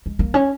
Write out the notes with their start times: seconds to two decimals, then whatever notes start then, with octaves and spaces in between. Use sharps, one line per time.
0.06 G#3
0.19 A#3
0.34 C#4